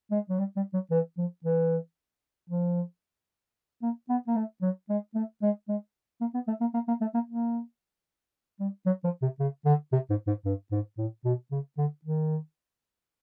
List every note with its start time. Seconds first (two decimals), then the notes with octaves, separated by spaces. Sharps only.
0.11 G#3
0.30 F#3
0.39 G3
0.56 G3
0.74 F#3
0.91 E3
1.18 F3
1.45 E3
2.50 F3
3.82 A#3
4.09 B3
4.27 A#3
4.36 A3
4.62 F#3
4.89 G#3
5.15 A3
5.42 G#3
5.69 G#3
6.21 A#3
6.34 B3
6.48 A3
6.61 A#3
6.74 A#3
6.88 A#3
7.01 A3
7.14 A#3
7.27 A#3
8.60 G3
8.86 F#3
9.04 F3
9.22 C3
9.39 C#3
9.65 D3
9.93 C3
10.10 G#2
10.27 G#2
10.45 G2
10.72 G#2
10.98 A2
11.25 B2
11.51 C#3
11.78 D3
12.05 D#3